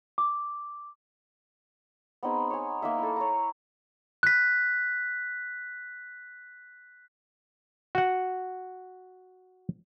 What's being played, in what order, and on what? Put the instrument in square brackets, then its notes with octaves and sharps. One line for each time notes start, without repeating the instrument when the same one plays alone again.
[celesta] D6
[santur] B3 C4 D#4 G#4
C#5 G#5
A#3 D#4 E5
E4 A4
C#5 A#5
[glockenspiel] F#6 B6
[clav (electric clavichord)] F#4 F#5